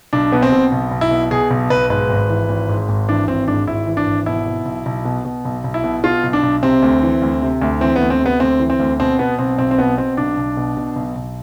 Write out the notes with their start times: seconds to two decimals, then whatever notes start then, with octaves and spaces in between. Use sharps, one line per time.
0.13 B1 D4
0.32 B2 B3
0.42 C4
0.52 B2
0.72 B1
0.91 B1
1.01 E4
1.11 B2
1.31 B2 G#4
1.51 B1
1.70 B1 B4
1.90 G#2 B4
2.10 G#1
2.30 E3
2.49 G#1
2.69 G#2
2.89 G#1
3.08 E3 D4
3.28 G#1 C4
3.48 G#2 D4
3.67 G#1 E4
3.87 E3
3.97 D4
4.07 G#1
4.26 B2 E4
4.46 B2
4.66 B1
4.86 B1
5.05 B2
5.25 B2
5.45 B1
5.64 B1
5.74 E4
5.84 B2
6.04 B2 F4
6.24 B1
6.33 D4
6.43 B1
6.63 C3 C4
6.82 D2
7.02 E3
7.22 D2
7.42 C3
7.62 D2
7.81 E3 C4
7.96 B3
8.01 D2
8.10 C4
8.21 C3
8.26 B3
8.40 D2 C4
8.60 E3
8.70 C4
8.80 D2
8.99 B2 C4
9.19 B2 B3
9.39 B1 C4
9.58 B1 C4
9.71 C4
9.78 B2 B3
9.97 B2 C4
10.17 B1 D4
10.37 B1
10.57 B2
10.77 B2
10.96 B1
11.16 B1